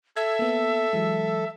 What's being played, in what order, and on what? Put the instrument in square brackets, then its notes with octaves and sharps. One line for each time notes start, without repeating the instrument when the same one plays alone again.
[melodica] A4 [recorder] E5 [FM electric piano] G#6
[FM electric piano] A#3 B3
E3 F#3 G#3